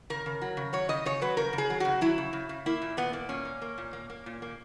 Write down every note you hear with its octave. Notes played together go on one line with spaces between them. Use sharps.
C#3 A#4
C#3
F#3
C#3
F#3 C#5
C#3 D#5
C#3 C#5
F#3 B4
C#3 A#4
C#3
G#4
F#3
C#3 F#4
F#3 E4
C#3
C#3
C#3
A#3 E4
A#2
A#2 B3
A#3
A#2 C#4
A#3
A#3
A#2
A#3
A#3
A#2
A#3